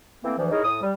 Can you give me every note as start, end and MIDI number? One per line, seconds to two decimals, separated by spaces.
0.24 0.34 52
0.24 0.34 57
0.24 0.34 58
0.24 0.34 60
0.38 0.49 38
0.38 0.49 52
0.38 0.49 53
0.51 0.60 56
0.51 0.60 63
0.51 0.60 64
0.51 0.60 68
0.51 0.60 70
0.51 0.60 73
0.64 0.80 45
0.64 0.80 87
0.82 0.92 55